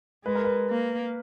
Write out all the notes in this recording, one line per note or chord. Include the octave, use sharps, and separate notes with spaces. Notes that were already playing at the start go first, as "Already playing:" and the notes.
G#3 B4
A#4
B4
A#3